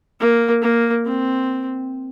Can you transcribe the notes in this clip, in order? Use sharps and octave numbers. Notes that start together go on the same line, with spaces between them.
A#3
A#3
C4